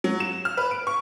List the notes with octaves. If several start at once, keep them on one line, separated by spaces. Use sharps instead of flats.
F#3
E7
F6
B4
D7
C#6